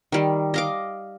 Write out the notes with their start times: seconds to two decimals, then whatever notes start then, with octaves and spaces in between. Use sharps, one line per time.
0.12 D#3 G3
0.54 D#5 F5 D6